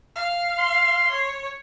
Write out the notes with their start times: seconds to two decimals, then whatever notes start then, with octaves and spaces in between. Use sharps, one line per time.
0.16 F5
0.59 C6
1.12 C#5